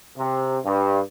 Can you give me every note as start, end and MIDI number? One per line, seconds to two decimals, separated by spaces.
0.17 0.58 48
0.65 1.00 43